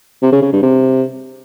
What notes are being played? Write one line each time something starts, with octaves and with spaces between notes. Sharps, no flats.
C3
C#3
C#3
G2
C3